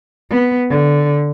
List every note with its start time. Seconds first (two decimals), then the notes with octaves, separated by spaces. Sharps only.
0.30 B3
0.69 D3